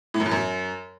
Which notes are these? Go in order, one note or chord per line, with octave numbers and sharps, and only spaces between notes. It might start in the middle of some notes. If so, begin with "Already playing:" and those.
A2
F#2
E2
F#2